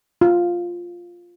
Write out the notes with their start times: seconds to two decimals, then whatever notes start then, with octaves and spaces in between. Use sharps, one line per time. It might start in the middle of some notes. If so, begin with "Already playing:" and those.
0.21 F4